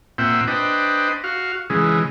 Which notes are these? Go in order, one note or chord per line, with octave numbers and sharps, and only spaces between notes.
A#2 C4 E5 F#5 G5
D4 B4 C5 D#5 G5
F#4 F5
C#3 E3 G#3